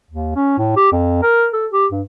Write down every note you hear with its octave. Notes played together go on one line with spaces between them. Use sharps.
D#2
C#4
A2
G4
F2
A#4
A4
G4
G2